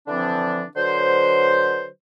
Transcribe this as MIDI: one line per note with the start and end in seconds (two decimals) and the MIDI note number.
0.08 0.63 50
0.08 0.63 52
0.08 0.63 53
0.08 0.63 60
0.08 0.63 62
0.76 1.86 50
0.76 1.86 54
0.76 1.86 71
0.76 1.86 72